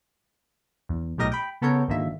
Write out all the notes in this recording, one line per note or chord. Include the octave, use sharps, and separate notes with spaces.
E2
B1 A2 G4 A#4 D#5 A#6
G5 B5
C#3 B3 A4 A#4 C#5 G6
G#1 D3 D#3 A#3 E5